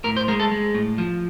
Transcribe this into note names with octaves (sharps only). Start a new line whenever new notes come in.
A2 A#4
C5
G#3 A#4
A4
G#3
A2
F3